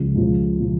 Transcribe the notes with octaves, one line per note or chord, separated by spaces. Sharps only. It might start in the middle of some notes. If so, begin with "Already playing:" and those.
Already playing: C#2 C#3 F3
C#2 C#3 F3
C#3 F3